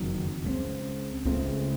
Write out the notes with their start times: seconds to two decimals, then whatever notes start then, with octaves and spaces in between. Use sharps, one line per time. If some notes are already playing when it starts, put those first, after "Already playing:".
Already playing: F#1 F2 D#3 F#3
0.44 C#2 C#3 A3 C4
1.25 C#2 C#3 A3 C4